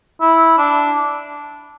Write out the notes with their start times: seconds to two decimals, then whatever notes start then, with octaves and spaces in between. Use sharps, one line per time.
0.21 E4
0.58 D4